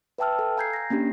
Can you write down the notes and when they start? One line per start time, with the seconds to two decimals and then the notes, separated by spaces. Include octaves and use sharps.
0.18 B4 E5 G5 A5 E6 F6
0.39 A4 E6
0.57 F5 G#5 A#5 G6 G#6 C7
0.73 A#6 C7
0.90 A#3 C#4 D4 G4